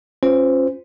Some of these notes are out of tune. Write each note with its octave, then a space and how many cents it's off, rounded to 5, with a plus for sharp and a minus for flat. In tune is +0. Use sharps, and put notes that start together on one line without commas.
C#4 -25 F4 +0 C5 -25